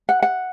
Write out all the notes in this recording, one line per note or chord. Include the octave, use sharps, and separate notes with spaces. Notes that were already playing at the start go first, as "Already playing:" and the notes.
F#5
F#5